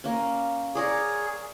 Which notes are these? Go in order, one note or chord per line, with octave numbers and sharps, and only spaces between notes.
A#3 C#4
G#4 A#4 C#5 D5